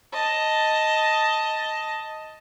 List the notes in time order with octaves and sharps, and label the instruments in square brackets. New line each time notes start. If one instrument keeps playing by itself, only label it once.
[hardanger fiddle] D#5 A5